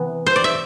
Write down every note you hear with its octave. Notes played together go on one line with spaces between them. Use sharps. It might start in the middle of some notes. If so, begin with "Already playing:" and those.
Already playing: C3 E3 B3
C5
D5
E5